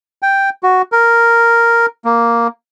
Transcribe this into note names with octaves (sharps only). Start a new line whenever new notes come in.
G5
F#4
A#4
A#3